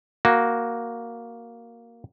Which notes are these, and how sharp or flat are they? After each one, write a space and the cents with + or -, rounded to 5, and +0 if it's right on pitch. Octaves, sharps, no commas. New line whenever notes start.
A#3 +0 F#4 +0